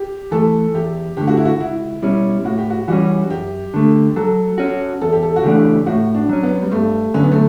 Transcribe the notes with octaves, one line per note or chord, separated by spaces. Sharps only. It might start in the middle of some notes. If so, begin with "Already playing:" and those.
Already playing: G4
E3 A3 A4
E2 G4
D3 A3 G4
F#4
E4
F#4
C#2 E4
B2 G3 C#4 E4
A2 F#4
G4
F#4
E3 G3 C#4 F#4
F#2 G4
D3 A3
F#3 A4
C#4 F#4
E2 A4
G4
A4
F#4
C#3 E3 A3 D4 G4
A2 F#4
D4
F#3 C#4
B3
G3
G2 A3
D3 F#3 C#4
B3
A3